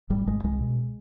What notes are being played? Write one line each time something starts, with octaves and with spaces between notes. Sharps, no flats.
G#1 G3
G#1 G#3
C2 G#3
B2